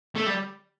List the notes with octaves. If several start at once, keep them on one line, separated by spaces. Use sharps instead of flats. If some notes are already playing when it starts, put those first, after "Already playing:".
A3
G3